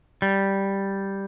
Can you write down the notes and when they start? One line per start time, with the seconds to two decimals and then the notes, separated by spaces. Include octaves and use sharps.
0.22 G3